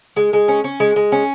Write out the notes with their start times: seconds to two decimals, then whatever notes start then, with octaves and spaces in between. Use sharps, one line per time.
0.16 G#3
0.33 G#3
0.48 C#4
0.64 C#4
0.80 G#3
0.96 G#3
1.12 C#4